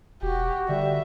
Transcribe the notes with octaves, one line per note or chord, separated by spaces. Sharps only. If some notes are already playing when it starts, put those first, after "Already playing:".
E1 F#4 G4
D3 G3 E5